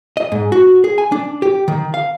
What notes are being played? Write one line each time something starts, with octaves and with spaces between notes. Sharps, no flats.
D#5
G#2
F#4
G#4
G#5
D4
G4
D#3
F5